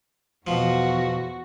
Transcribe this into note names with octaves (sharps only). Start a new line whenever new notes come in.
E2 B2 F3 F#4